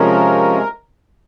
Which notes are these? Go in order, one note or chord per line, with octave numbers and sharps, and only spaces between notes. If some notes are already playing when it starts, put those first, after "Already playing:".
Already playing: C3 F3 G#3 C#4 A#4